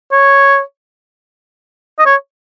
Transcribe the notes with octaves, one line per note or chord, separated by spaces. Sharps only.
C#5
D#5
C#5